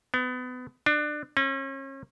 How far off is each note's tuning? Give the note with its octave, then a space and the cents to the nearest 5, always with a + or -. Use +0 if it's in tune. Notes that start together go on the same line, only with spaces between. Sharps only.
B3 +30
D4 +25
C#4 -35